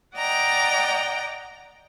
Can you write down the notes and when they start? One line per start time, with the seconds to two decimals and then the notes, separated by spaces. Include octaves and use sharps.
0.15 D5 D#5 F#5 G5 A#5